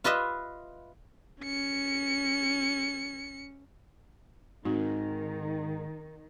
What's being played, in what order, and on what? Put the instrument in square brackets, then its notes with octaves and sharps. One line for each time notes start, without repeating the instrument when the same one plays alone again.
[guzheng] F4 B4 D#5 E5
[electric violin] C#4 C#7
[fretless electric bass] G#2 [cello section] D#3 [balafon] C4 D#4 F#4